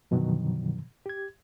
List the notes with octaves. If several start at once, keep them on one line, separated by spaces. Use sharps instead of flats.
F#2 B2 D3 D#3 F3 F#3
G4 G#6